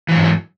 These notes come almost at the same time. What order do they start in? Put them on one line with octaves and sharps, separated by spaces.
E3 F#3 G#2